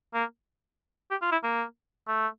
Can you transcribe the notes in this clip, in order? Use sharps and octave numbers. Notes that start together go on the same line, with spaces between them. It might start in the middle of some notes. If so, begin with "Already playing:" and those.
A#3
G4
F4
E4
A#3
A3